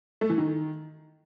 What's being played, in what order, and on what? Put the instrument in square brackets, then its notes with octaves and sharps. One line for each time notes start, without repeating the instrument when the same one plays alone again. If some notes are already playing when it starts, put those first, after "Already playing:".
[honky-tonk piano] A3
E3
D#3